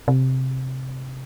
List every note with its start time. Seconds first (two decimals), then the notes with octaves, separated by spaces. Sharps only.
0.08 C3